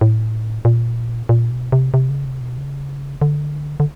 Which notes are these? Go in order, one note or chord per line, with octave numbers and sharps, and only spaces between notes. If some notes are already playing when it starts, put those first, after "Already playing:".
A2
A#2
A#2
B2
C3
C3
C#3
C3
B2
C#3
D3
D3